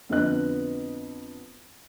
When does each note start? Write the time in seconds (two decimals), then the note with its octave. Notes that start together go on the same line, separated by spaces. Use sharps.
0.09 F2 D3 B3 B4 D#5 F#6